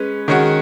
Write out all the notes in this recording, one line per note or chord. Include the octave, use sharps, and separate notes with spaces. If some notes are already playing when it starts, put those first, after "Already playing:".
Already playing: G#3 C#4 B4
D#3 G#3 C#4 F#4